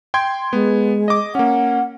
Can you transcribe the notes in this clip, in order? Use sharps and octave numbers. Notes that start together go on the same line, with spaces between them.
G5 C6 G#6
G#3 B3
D#5 D6
A#3 C#4 F#5